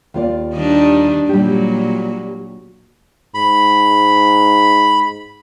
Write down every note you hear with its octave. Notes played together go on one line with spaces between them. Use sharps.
D#2 F4 D5
D#3 G3 D4
A#2 F#3 G3 G4
G#2 B5